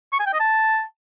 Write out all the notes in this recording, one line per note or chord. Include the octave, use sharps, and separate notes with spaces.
C#6
G#5
G5
D#5
A5